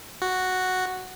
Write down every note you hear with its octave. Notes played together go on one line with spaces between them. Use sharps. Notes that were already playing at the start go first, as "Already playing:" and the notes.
F#4